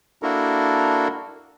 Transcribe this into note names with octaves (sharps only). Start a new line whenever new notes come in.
A#3 D4 E4 F#4 A4 A#4